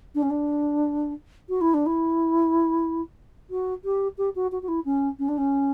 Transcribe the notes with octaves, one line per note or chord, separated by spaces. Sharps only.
D4
C#4
D4
F#4
E4
D4
E4
F#4
G4
G4
F#4
F#4
F#4
E4
C#4
C#4
D4
C#4